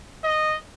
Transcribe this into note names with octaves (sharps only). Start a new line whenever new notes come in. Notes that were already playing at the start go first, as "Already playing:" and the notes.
D#5